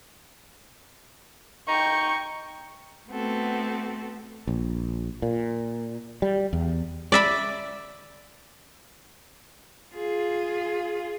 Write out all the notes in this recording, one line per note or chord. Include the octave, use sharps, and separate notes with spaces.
D#4 G5 C#6
A3 B3 C4 F#4 A4
A#1
A#2
G3
E2
D5 E5 B5
F4 G#4